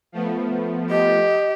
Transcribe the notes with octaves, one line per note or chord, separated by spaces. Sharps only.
F3 A3 B3
G4 D#5